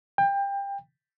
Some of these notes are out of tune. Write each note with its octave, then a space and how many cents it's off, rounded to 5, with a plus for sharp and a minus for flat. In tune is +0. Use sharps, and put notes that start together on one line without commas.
G5 +25